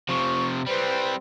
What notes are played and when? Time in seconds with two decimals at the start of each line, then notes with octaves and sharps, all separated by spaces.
0.09 C3 F3 C#6
0.66 G3 C4 B4 C5